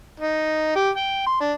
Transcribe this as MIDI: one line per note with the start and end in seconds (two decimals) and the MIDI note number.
0.20 0.72 63
0.76 0.90 67
0.97 1.24 79
1.26 1.37 84
1.41 1.53 62